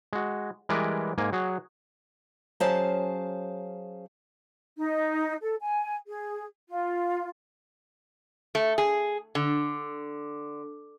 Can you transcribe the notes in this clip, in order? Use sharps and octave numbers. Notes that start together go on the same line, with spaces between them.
G#3 F#4
E3 G3 G#3 A#4 B4 D5
G#2 A#3 G#5
F#3 F#4 G#4
F#3 C#4 G#4 C5 F5 A5
D#4
A4
G#5
G#4
F4
A3
G#4
D3